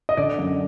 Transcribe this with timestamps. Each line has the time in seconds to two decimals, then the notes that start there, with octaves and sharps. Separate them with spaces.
0.09 D#5
0.17 D3 D5
0.39 F#2